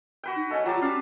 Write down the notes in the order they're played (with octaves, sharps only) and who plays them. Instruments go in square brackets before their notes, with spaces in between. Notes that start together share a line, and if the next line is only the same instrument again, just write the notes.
[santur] F#4 B4 G5
[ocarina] D#4
[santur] A3 C#4 [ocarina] D#5
[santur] F#3 G3 A5 [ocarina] F4
[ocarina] C#4 [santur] D4 F5